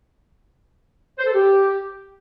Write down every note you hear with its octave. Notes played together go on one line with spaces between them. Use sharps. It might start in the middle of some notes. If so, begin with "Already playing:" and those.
C5
A4
G4